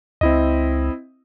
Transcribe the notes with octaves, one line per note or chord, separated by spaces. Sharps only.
C#2 C4 E4 D#5